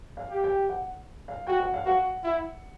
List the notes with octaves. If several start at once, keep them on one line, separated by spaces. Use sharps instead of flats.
F5
G4
G5
F#5
F5
F#4 G5
F#5
F5
F#4 F#5
E4